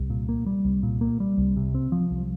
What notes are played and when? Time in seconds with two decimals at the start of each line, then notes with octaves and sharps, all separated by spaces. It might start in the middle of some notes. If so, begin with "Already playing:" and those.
Already playing: C2
0.10 A#2
0.29 A#3
0.46 G3
0.65 C2
0.83 A#2
1.01 A#3
1.20 G3
1.38 C2
1.57 C3
1.75 C4
1.92 F3
2.11 C2